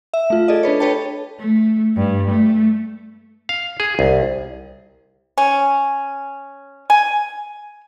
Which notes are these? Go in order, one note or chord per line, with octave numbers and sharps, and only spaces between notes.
E5
A3 F4
G#4 A4 D5 D#5
D4 A4 B4 C#5
A4 B4 C#5 G5 A5
A3
G2
A3
F5
G#4
C2
C#4
G#5